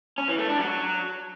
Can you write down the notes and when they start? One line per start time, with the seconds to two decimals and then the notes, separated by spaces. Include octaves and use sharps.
0.18 C#4
0.28 E3
0.39 A3
0.49 D4
0.59 F#3